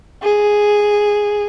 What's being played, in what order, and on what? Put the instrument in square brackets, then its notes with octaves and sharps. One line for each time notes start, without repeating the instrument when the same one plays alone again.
[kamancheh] G#4